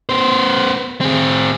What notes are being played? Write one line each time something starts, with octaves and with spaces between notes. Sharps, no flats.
B3 C5
C4 G#4